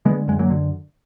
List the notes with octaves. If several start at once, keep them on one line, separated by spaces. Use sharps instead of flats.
D3 G#3 B3
F#2 G#3
F#3 A#3
D3